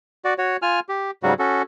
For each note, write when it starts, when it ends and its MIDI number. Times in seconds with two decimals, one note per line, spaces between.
0.25 0.34 66
0.25 0.34 74
0.38 0.57 66
0.38 0.57 73
0.62 0.80 65
0.62 0.80 80
0.62 0.80 89
0.89 1.11 67
1.23 1.34 44
1.23 1.34 49
1.23 1.34 54
1.23 1.34 55
1.23 1.34 66
1.39 1.62 61
1.39 1.62 66
1.39 1.62 69